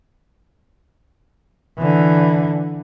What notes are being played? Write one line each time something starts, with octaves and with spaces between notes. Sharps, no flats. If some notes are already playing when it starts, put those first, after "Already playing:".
D3 E3